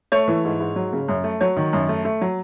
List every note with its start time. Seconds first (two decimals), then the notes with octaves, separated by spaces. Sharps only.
0.12 A3 C#5
0.28 E3
0.45 G#2
0.60 G#2
0.76 F#3
0.93 C#3
1.08 F#2
1.24 A3
1.41 F#3 C#5
1.56 D#3
1.73 F#2
1.89 A3
2.05 A3
2.21 F#3